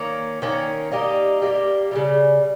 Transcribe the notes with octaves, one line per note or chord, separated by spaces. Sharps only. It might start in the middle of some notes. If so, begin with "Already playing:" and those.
Already playing: D#3 A#3 C#4
D#3 A#3 C#4
G3 A#3 D#4 G4
G3 A#3 D#4 G4
C#3 E3 G3